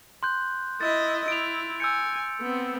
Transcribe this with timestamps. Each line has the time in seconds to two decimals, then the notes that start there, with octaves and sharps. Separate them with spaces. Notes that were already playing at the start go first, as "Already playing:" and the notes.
0.23 C6 F#6 G6
0.81 E4 D#5 A6
1.28 E4 D7 F7
1.80 G#5 E6 G6 C#7
2.41 B3 C4